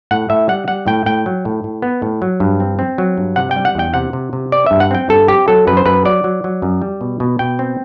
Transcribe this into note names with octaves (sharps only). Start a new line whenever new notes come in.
A2 F#5
A2 E5
G3 F#5
G3 F#5
A2 G5
A2 G5
F#3
A2
A2
B3
A2
F#3
G2
C4
C4
F#3
G2
C3 F#5
G5
G3
F#5
E2 G5
C3 F#5
C3
C3
C4 D5
G2 E5
F#5
C4 G5
G2 A4
C4 G4
F#3 A4
F#2 B4
C5
F#2 B4
F#3 D5
F#3
F#3
F#2
G3
B2
B2
B2 G5
C4